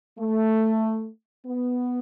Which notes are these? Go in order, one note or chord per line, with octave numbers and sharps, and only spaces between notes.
A3
B3